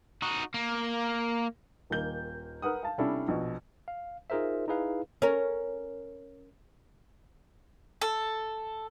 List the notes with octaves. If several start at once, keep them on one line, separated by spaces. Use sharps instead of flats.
D#4 F#4
A#3
D#1 D#3 A#3 G6 G7
A#4 B4 F#5 D#6
F5 A5
C3 G3 C#4 D4 E4 A4
A#1 B2
F5
D#4 F4 G#4 A#4 C5 E5
D#4 E4 G#4 B4 F5
C#4 A#4
A4